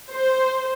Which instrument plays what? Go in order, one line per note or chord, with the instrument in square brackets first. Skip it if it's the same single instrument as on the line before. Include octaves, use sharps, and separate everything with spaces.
[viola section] C5